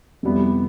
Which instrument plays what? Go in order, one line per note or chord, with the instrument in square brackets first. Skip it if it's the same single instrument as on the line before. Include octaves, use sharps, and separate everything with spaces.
[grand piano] F2 C3 G3 B3 E4